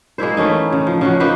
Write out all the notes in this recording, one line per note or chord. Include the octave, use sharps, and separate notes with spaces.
G#3 A#3 E4 C5
E3 A3 C#4 D#4
C#3
F3
C#3 F3 F#4
A#3 D#4 B4 C5